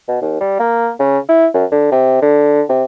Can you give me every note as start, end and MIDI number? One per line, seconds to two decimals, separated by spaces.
0.09 0.19 47
0.22 0.36 39
0.40 0.58 55
0.60 0.89 58
0.99 1.18 49
1.29 1.46 64
1.54 1.65 42
1.72 1.89 50
1.92 2.19 48
2.22 2.62 50
2.69 2.84 48